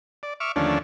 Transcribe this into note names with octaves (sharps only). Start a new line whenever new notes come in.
D5
E5 C#6 D6 F6
D#2 D3 F3 A3 C#4 D4